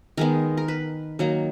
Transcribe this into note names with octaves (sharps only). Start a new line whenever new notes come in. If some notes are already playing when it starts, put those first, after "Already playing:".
D#3 G#3 B3 A#4
A#4
B4
D#3 F#3 A#3 A#4